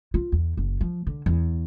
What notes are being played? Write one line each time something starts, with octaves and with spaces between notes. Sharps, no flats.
F4
E2
F#1
F3
D3
E2